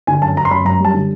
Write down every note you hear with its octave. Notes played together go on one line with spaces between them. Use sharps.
D3 G#5
F#2 A5
F#2 A#5
C6
F#2 B5
F#2 A#5
G3 A5
D3